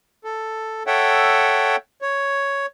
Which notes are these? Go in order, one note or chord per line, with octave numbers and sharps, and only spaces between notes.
A4
A4 C#5 E5 F#5 G5
C#5